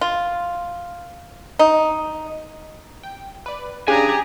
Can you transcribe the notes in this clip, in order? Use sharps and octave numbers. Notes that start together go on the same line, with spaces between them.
F4
D#4
G5
B4 D5
C#3 D4 G4 G#4 G#5 A#5 G#6